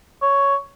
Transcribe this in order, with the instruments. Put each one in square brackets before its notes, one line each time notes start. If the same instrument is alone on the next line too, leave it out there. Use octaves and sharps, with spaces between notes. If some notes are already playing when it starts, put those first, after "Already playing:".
[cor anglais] C#5